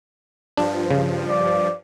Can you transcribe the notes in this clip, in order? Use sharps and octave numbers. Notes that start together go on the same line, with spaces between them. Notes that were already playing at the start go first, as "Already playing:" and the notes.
G2 F3 D4
C#3
D5